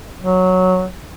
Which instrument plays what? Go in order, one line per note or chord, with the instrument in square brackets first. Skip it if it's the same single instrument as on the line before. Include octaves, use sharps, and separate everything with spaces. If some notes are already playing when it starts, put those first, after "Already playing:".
[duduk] F#3